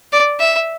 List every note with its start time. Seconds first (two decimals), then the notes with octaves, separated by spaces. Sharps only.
0.12 D5
0.40 E5